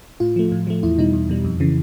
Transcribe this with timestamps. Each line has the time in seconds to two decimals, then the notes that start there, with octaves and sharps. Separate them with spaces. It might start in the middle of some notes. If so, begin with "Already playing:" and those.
0.20 A2 F4
0.36 F3 A3
0.52 A2
0.67 F3 A3
0.83 E2 E4
0.98 B2 G3 D#4
1.13 E2
1.29 B2 G3
1.45 F2
1.60 C#3 E3